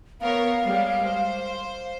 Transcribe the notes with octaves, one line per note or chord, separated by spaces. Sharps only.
B3 A#4 C#5 F5
G3 G#3 G4
C5